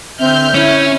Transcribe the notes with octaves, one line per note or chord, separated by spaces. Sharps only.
D3 C4 E5 F6 G6
C#4 E4